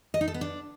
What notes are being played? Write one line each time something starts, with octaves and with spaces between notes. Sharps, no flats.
D#5
D#4
A4
B3
D4